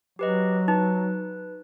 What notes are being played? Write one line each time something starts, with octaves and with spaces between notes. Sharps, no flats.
F#3 G4 B4 D#5
D#4 B4